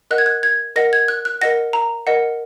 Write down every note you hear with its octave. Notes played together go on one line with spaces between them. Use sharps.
A#4 D#5 F#5 F#6
G#6
F#6
G#6
A#4 D#5 F#5 A#6
G#6
F#6
F#6
A#4 D#5 F#5 A#6
A#5
A#4 D#5 F#5